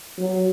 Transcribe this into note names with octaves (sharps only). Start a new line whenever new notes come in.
F#3